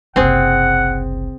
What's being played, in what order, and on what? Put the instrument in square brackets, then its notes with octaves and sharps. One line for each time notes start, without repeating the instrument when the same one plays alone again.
[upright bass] F#1 C2 [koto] C4 G#4 [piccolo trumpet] F#5